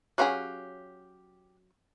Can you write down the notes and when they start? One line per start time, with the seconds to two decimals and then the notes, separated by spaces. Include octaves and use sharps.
0.18 F#3 C#4 G4 G#4 F5 F#5